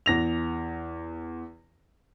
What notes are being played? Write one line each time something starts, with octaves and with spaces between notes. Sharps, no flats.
E2 A#6 F7